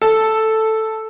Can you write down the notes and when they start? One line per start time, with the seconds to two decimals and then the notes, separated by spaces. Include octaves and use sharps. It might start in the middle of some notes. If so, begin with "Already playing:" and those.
0.02 A4